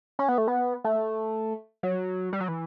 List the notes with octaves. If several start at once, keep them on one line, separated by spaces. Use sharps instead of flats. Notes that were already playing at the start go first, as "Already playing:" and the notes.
C#4
B3
A3
B3
A3
F#3
G3
F#3
E3